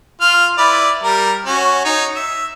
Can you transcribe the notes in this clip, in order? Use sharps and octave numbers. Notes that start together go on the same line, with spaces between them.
F4 F6
E4 B4 D5
G3 A#4
C#4 F#4
D#4 C#5
E5